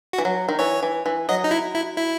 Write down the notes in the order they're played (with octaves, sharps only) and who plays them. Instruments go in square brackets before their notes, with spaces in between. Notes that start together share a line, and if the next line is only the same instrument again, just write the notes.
[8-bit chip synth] F#4
[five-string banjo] E3
F#3
D#3
[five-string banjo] E3 [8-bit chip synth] C#5
[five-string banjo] E3
E3
[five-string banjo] F#3 [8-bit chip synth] D#5
[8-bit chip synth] D#4
E4
E4
E4